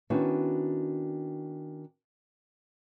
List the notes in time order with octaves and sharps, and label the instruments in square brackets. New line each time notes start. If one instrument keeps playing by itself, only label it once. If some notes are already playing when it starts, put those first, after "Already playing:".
[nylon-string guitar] D#3 B3 C#4 D4 E4 F#4